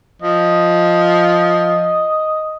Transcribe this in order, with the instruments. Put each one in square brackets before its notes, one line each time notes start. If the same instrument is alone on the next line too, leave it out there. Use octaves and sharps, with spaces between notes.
[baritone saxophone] F3 [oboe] D#5